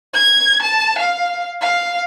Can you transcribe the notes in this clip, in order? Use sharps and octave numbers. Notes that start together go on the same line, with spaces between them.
G#6
A5
F5
F5